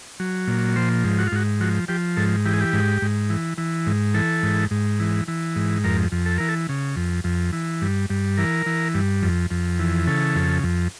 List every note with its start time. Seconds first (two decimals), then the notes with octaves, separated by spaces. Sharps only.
0.20 F#3
0.48 A#2
0.76 F3 C5
1.04 G#2
1.18 F#4
1.27 F4
1.32 G#2 F#4
1.60 F3 F#4
1.88 F3 G4
2.17 G#2 A4
2.45 E3 G4
2.53 G#4
2.60 G4
2.73 G#2
3.02 G#2
3.30 E3
3.58 E3
3.87 G#2
4.14 E3 A4
4.43 G#2
4.71 G#2
5.00 E3
5.28 E3
5.56 G#2
5.84 F2 A#4
6.12 F2
6.26 A4
6.38 E3 A#4
6.49 A4
6.69 C#3
6.96 F2
7.24 F2
7.53 E3
7.82 G2
8.10 G2
8.37 E3 A#4
8.66 E3
8.94 G2
9.22 F2
9.51 F2
9.79 E3
10.07 C#3 A4
10.35 F2
10.63 F2